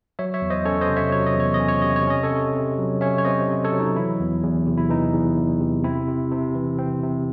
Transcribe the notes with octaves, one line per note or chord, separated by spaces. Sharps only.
F#3 C#5 E5
C#5 E5
E2
C5 D#5
C#4 A4 C#5
C5 D#5
C3
C#5 E5
F#3 C#5
D#5
E2 C#5
D#5
C#4
C#5
C3 D#5
C#5
C#4 D#5
A4 C#5
C3
C3
F#3
C#4 C#5 E5
C#5
C3 C5 D#5
C3
A4 C#5
F#3
D#4
E3 E4
E2
E2
C3
E4
E3 D#4
E2
E2
C3
C4 E4
C3
C3
E3
C4
C3